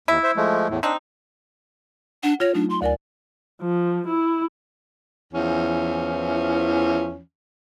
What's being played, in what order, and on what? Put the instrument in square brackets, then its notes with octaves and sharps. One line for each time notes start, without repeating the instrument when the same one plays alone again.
[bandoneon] D#2 [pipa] E4
[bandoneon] C5 E5
F3 G#3 A3
E2 A2
[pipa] C4 D#4 [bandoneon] D4
[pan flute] D4 [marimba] F#5
[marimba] F4 A#6 [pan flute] C#5
[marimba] F#3 A3 D#4 [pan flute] D4
[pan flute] C6
[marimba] D2 A#4 G#5 [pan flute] D5
[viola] F3
E4
[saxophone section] E2 E3 F3 C#4